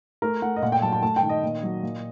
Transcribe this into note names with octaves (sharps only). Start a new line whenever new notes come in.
A3 A#4
A3 F#5
D#5
A#2 F#5
G5
F#3 A5
A5
A3 A5
G5
D#3
D#5
A#2
F#3
A#2